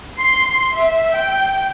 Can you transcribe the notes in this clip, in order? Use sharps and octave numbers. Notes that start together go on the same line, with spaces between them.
C6
E5
G5